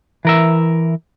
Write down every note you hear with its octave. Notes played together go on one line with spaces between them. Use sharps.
E3 A#4 E5